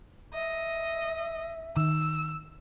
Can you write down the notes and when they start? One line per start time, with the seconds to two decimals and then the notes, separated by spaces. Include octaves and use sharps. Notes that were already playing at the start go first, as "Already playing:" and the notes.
0.34 D#5 E5
1.77 D#3 E6